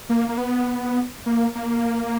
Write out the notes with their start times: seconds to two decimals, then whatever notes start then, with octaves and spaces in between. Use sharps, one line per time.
0.09 A#3
0.29 A#3
0.38 B3
1.26 A#3
1.55 A#3